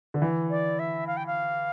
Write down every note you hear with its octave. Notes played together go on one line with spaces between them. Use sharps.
D3
E3
D5
E5
F5
G5
F5